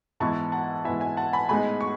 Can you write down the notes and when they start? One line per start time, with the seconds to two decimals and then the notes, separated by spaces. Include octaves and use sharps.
0.20 G#2 E3 B3 E4 A5 C#6
0.52 F#5 A5
0.84 G#2 E3 B3 E4 E5 G#5
1.00 E5 G#5
1.17 F#5 A5
1.33 G#5 B5
1.49 A2 G#3 B3 D#4 G#5 B5
1.81 C#6